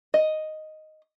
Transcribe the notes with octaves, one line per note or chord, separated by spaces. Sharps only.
D#5